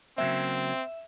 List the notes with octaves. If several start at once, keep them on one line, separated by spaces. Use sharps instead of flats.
C#3 F#3 A#3 C4 E5